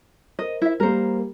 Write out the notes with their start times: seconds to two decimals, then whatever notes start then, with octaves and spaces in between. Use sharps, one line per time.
0.39 A#4 C5 D#5
0.62 E4 E5
0.80 G3 A#3 A#4 C5